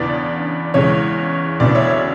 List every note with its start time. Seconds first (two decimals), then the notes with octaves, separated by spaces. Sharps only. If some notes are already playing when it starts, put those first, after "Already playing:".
Already playing: E2 C#3 E3 B3 D4 D5
0.74 E2 C#3 E3 G#3 C#5
1.60 D2 C#3 E3 B3 D4 D5
1.75 C#5 E5
1.89 C#5 E5